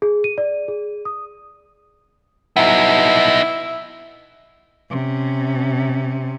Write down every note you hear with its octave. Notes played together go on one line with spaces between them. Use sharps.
G#4
D#7
D5
G#4
D#6
B3 D#4 E4
C3 C#4